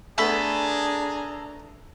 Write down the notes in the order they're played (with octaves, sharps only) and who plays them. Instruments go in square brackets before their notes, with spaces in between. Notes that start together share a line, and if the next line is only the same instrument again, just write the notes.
[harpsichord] A3 B3 [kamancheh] D4 A#5 [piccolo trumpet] G#4 [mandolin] A4 B5